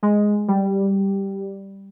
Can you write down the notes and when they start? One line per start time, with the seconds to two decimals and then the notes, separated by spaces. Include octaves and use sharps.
0.03 G#3
0.48 G3